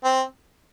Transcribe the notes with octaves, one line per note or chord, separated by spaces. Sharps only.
C4